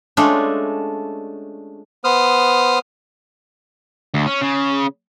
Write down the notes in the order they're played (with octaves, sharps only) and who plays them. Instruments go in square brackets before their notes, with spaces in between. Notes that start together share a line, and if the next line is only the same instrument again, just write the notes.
[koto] G#3 A3 C#4 D4 F4 A4
[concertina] B3 C5 D#6 F6
[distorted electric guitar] D2
C#4
C#3